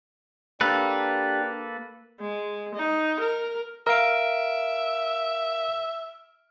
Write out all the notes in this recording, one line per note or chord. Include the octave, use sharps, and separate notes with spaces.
A#3 D4 G4 A4 B4
G#3
D#4
A#4
A#4 E5 F5 F6 D7